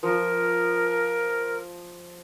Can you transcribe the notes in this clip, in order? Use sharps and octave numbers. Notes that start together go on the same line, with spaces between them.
F3 A#4